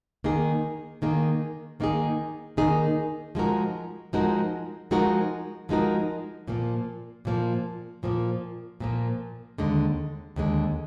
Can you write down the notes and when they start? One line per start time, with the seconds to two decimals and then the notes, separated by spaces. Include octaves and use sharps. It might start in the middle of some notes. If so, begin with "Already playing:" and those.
0.24 D#3 A#3 D#4 G#4
1.02 D#3 A#3 D#4 G#4
1.80 D#3 A#3 D#4 G#4
2.57 D#3 A#3 D#4 G#4
3.35 F3 G#3 D#4 F#4 A#4
4.13 F3 G#3 D#4 F#4 A#4
4.91 F3 G#3 D#4 F#4 A#4
5.69 F3 G#3 D#4 F#4 A#4
6.48 A#2 F3 A#3
7.25 A#2 F3 A#3
8.03 A#2 F3 A#3
8.80 A#2 F3 A#3
9.58 D#2 D3 G#3
10.36 D#2 D3 G#3